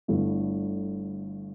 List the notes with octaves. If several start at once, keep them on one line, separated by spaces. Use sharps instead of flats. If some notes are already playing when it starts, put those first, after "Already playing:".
G1 G2 D3 A3 E4